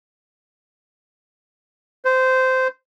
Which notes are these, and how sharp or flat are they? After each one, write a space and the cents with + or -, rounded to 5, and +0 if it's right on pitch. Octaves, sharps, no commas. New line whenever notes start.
C5 -15